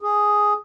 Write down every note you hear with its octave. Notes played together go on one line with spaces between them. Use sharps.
G#4